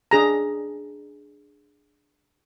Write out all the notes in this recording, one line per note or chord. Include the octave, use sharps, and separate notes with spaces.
D4 G#4 A#5